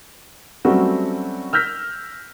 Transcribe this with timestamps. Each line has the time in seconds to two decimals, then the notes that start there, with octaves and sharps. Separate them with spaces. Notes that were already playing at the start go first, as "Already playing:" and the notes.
0.65 F#3 G3 A3 C4 C#4 F#4
1.53 E6 F6 G6 A#6 B6